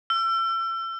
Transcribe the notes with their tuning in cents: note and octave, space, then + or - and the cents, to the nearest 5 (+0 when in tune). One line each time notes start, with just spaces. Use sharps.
E6 +35